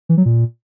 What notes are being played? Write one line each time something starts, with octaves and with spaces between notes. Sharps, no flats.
E3
F#3
A#2